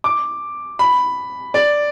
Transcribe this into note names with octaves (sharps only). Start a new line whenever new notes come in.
D6
B5
D5